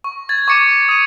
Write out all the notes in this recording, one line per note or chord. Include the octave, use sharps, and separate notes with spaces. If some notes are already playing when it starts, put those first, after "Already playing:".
C#6
G#6 A6
C#6 D6 C#7 D#7 E7
D#6 D#7